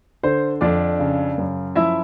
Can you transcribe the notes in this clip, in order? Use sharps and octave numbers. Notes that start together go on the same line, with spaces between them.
D3 C5
F2 D4 D5
C#3
F#2
F3 E4 E5